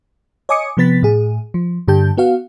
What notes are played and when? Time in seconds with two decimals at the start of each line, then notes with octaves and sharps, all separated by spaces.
0.49 C#5 D#5 G#5 D6 D#6 C#7
0.77 C3 F3 B3 B4 A6 B6
1.03 A2 G#4
1.54 F3
1.88 G2 D3 G4 A5 G6
2.17 B3 F#4 F5